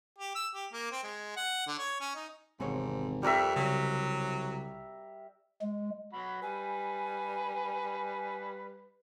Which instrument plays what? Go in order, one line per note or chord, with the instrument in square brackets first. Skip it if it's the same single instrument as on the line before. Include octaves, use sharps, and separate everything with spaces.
[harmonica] G4
E6
G4
A#3
C4
G#3
F#5
D3
C#5
C#4
D#4
[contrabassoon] G#1 [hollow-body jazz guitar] E2 C3 C#5 [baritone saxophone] G#2
[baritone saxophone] F2 [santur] G3 A#4 E5
[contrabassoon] C2 [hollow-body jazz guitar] C#3 [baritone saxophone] F#3
[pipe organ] G#3
[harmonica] F#3 F#4 B5
[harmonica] G3 B4 [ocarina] G#5